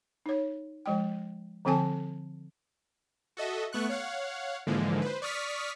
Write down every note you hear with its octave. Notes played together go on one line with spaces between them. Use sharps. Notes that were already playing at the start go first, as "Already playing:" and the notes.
D#4 C#5
F3 G#3 G5
D3 F3 C4 A4 G#5 A5
F#4 A4 D#5 E5
A3 B3 C#6 F#6
C#5 F5 F#5
G#2 D3 E3 F3 G#3 A#3
B4 C5
D5 C#6 D#6 F6 B6